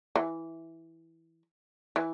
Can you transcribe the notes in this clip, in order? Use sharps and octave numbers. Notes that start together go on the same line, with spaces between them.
E3
E3